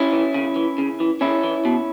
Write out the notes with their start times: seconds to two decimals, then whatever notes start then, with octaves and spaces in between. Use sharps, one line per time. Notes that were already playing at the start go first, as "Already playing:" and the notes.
Already playing: C#4 E4
0.13 E3
0.34 C#3
0.56 E3
0.78 C#3
1.00 E3
1.21 C#3 C#4 E4
1.44 E3
1.65 B2